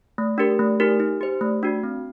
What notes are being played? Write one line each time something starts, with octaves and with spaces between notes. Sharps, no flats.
A3
D4 G4 A#4
A3
D#4 G4 A#4
D#4
G4 C5
A3
D4 F#4
C4